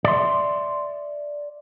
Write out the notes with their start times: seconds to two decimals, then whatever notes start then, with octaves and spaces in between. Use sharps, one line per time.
0.05 D5 E5 C6